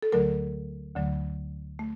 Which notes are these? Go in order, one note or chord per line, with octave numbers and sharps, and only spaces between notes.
A4
D2 D3 F#3 A3 A#4
D2 D3 F#3 A3
A3